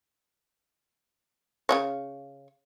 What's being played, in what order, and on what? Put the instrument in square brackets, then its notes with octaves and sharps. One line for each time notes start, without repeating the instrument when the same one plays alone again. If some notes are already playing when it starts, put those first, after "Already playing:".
[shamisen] C#3 G#3 C#5